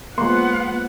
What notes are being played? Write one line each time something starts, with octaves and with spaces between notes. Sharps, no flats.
F3 G#3 A#3 B3 F#5 C6